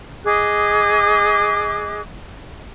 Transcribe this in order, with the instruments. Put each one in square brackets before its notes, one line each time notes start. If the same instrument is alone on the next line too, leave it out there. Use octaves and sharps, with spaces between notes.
[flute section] G#4 D#5 D6 F#6